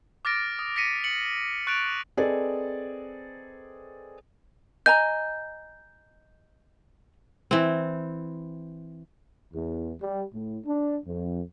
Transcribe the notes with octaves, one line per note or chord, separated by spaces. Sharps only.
D6 F6 A6 A#6 D7
D#6
A#6 B6 C#7 D#7
C#7 F#7
C#6 F#6 A6 C#7 D7 F7
C4 G#4 A4 B4 D5 D#5
D#5 G#5 A#5 G6
E3 C4
E2
G3
A2
D4
F2